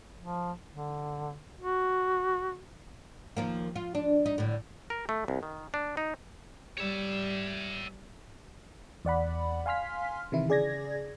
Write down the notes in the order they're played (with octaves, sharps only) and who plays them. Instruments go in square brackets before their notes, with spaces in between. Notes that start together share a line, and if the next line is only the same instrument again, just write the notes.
[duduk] F3
D3
F#4
[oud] D#2 F3 A#3
F4
D4
D#4
A2 D3
[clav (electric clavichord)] A#4
A3
C2
D#3
D4
D#4
[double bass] G3 [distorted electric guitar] C#5 E5
[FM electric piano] E2 D5 F#5 B5
F5 G#5 C6 F6 B6
C3 D#3 E3 E4
C#3 G#4 D5 G#6 A#6